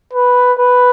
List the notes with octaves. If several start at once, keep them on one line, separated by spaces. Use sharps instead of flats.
B4
B4